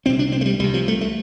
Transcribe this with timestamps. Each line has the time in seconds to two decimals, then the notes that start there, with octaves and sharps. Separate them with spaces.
0.05 C2 C4
0.09 C3
0.19 D4
0.32 C4
0.41 A3
0.46 G3
0.60 C2 G3
0.64 C3
0.74 F3
0.88 A3
1.01 A3